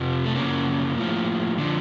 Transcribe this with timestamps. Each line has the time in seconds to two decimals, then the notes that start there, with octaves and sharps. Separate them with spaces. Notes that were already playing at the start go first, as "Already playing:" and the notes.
Already playing: F2 C3 F3
0.25 A3
0.35 F#2 C#3 F3 A#3
0.96 A2 F3
1.58 D3 F3